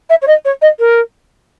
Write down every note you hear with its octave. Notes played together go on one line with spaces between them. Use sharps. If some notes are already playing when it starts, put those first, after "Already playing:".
E5
C#5
D#5
C#5
D#5
A#4